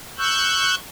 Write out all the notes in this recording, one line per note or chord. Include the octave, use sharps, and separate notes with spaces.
C#6 E6 F#6 G6